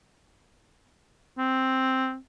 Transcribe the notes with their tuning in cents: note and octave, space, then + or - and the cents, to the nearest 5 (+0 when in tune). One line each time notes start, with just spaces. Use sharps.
C4 +0